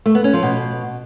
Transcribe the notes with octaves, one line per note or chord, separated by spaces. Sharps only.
A3
B3
C#4
F3
B2